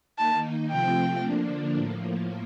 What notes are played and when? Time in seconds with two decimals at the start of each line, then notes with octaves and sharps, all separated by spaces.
0.17 D#3 A#3 D#4 A5
0.71 C3 F3 A3 C4 F4 G5
1.23 D3 F3 A#3 D4
1.76 A2 F3 A#3